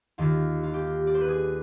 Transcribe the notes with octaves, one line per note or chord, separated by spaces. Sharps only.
D#2 D#3 F4
F4
G4
D5
C5
B4
G#4